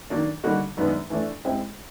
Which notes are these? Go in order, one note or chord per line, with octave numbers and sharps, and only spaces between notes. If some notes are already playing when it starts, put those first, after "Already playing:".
D#3 F#3 A#3 D4
D3 G3 A#3 D#4 F#4
F#2 D#3 G#3 B3 D4
E3 A3 D4
G#3 C4 E4 G4